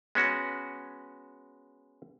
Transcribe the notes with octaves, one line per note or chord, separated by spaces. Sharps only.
G#3 B3 C#4 F#4